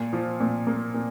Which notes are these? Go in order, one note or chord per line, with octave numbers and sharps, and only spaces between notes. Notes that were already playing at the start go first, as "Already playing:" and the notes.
Already playing: A#2
F3
A#2
A#3
A#2